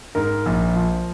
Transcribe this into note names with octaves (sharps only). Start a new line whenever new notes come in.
G#2 A#4
A#1
F3